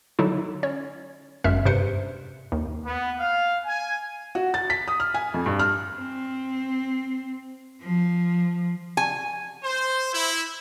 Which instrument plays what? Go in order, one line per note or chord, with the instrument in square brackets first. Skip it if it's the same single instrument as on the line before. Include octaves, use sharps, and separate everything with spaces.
[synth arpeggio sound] D3 F#3 D#4 E4
C#4 C#5
G1 F#2 G#3 E5 F6
G2 C3 B4 C5 C#7
D#2
[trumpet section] B3
F5
G#5
[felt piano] F#4
A6
B6
D#6
F6
G#5
F2
G2
F6
[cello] C4
F3
[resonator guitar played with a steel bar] G#5
[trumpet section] C5
E4